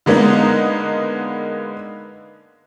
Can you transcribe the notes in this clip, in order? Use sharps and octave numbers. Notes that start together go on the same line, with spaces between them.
D3 G#3 A#3 B3 D#4